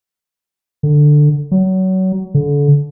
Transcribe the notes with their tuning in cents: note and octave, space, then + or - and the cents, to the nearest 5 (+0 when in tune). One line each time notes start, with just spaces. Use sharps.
D3 +10
F#3 +25
D3 -30